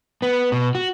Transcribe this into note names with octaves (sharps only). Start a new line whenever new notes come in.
B3
B2
F#4